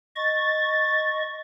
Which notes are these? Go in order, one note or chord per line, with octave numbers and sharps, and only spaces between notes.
D#5 C#6 A6